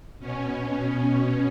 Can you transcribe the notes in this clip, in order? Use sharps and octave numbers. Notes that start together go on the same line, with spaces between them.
B2 C#4